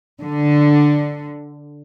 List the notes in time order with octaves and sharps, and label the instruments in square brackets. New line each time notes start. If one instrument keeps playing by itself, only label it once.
[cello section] D3